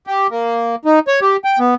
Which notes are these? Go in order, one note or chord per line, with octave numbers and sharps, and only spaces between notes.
G4
A#3
D#4
C#5
G4
G5
B3